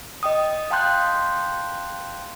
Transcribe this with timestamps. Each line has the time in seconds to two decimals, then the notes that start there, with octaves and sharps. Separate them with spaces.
0.23 D#5 G5 D#6
0.70 F5 G5 A5 C6 F#6 G6